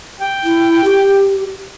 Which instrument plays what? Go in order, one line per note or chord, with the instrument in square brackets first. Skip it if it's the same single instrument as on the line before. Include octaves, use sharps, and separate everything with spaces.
[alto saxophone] G5
[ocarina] E4
G4